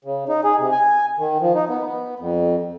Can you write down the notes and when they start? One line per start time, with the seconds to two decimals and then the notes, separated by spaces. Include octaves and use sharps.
0.05 C#3
0.29 D#4
0.44 G#4
0.58 C3
0.72 G#5
1.18 D#3
1.41 F3
1.55 D#4
1.69 B3
1.85 B3
2.20 F2